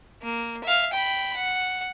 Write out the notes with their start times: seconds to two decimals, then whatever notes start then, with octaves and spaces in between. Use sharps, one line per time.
0.22 A#3
0.64 E5 F5
0.93 G5 B5
1.37 F#5